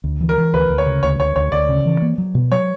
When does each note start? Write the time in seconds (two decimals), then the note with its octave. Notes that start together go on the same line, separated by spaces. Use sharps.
0.04 D2
0.21 E3
0.29 A#4
0.37 E3
0.54 D2 B4
0.69 D2
0.78 C#5
0.86 C#3
1.03 D2 C#5
1.19 D2 C#5
1.36 D2 C#5
1.52 D2 D5
1.69 C#3
1.85 E3
2.02 A#3
2.18 F#3
2.35 B2
2.51 F#3 C#5